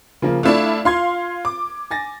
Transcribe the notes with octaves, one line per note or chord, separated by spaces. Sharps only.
C#3 F3 A#3
A3 D4 E4 F4
F4 F5 C6 G#6
D6
G#5 A6 A#6